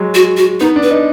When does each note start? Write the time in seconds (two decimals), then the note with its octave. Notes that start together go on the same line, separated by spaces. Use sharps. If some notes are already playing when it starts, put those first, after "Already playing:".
Already playing: F#3 G#3
0.15 F#4
0.37 F#4
0.60 B3 D#4
0.76 D4
0.83 B4
0.91 D#4